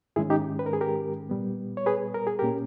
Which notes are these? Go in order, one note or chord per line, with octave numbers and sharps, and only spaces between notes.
G#2 D#3 G#3 C#4 E4 G#4
D#4 G4
B4
A#4
G#4
G4 A#4
A#2 G3 B3
C#5
G#4 B4
A#4
G#4
A#2 A#3 C#4 G4 A#4